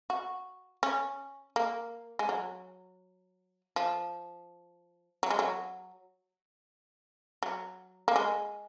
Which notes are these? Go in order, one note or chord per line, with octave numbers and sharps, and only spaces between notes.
F#4
C#4
A#3
G#3
F#3
F3
F#3
G#3
F#3
F#3
A#3
G#3